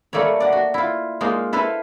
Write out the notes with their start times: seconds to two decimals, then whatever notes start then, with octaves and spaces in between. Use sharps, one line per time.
0.13 G3 A3 A#3 A4 C#5
0.40 D5 F#5
0.52 F#4
0.74 E4 F4
1.21 G#3 A#3 D#4 F4
1.53 E4 A4 B4 C5 F5